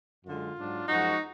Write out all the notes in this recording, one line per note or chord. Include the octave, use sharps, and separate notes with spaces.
F#2 D3 G#3 F4
G#2 F#3 D4
F#2 F3 G#3 D#4 F#4